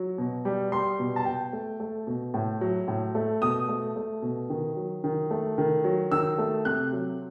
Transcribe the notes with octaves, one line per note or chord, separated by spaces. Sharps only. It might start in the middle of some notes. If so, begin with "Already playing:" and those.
Already playing: F#3
B2
G3
G3 C6
B2
A5
B2 G5
A3
A3
B2
A2
F#3
A2
A3
B2 D#6
A3
A3
B2
D#3
F#3
D#3
A3
D#3
F#3
D#3 E6
A3
C3 F#6
F#3